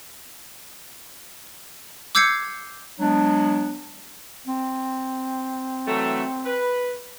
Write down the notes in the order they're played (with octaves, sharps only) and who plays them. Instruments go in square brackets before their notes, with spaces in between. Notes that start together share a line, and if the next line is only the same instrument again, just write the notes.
[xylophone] D6 E6 G6 G#6 C7 C#7
[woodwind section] F#3 G#3 B3 D4
[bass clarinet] C4
[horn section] E3 F#3 A3
B4